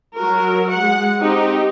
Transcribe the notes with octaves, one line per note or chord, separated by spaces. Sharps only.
F#3 F#4 A#4
G#3 F#5
C4 D#4 G4